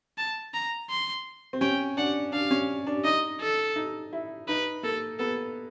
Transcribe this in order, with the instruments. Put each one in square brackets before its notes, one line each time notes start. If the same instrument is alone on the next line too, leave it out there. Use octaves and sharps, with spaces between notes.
[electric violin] A5
A#5
C6
[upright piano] C4
[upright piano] C#4 [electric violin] G5
[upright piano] D4 [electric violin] F#5
[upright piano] D4 [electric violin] F5
[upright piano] C#4
D4
[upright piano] D#4 [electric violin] D#5
[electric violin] A4
[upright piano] D#4
E4
[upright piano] D#4 [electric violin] B4
[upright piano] A#3 [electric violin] A4
[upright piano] B3 [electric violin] A4